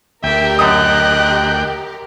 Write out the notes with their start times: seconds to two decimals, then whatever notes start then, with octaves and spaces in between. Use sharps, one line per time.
0.24 D2 G4 A#4 E5 G5
0.59 F#2 D#5 D#6 F#6